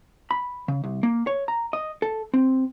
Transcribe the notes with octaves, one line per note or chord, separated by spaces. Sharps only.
B5
C#3
C2
A#3
C#5
A#5
D#5
A4
C4